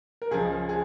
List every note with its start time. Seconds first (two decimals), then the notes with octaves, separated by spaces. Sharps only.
0.22 A#4
0.31 C#2 C#3 F3 G#4
0.69 G#4